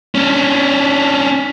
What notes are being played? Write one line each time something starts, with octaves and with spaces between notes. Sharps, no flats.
C#4 D4